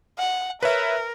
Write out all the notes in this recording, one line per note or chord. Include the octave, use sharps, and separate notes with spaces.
F#5
A#4 B4 C#5 E5